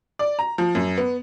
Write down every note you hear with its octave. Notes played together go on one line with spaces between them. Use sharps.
D5
A#5
F3
F#2
B3